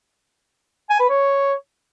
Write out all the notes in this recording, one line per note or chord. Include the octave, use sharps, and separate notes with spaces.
G#5
B4
C#5